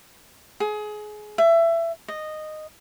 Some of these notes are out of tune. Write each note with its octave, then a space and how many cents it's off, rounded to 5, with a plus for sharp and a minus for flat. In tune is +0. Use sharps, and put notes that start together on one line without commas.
G#4 +25
E5 +20
D#5 -10